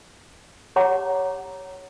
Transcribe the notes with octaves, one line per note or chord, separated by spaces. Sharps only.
G4 C#5 F#5 A#5 D6